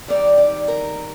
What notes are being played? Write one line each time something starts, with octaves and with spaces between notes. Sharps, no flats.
D#2 D#3 G3 C4 D#4 D5
D5
A#4